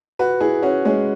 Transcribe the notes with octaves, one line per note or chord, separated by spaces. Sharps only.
F#4 B4
E4 G#4
C#4 F#4
G#3 C#4